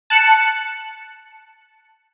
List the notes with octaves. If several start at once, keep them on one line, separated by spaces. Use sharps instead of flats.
A5 F#6 C#7